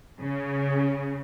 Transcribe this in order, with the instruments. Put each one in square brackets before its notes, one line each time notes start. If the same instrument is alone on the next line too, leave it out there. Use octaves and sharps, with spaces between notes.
[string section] C#3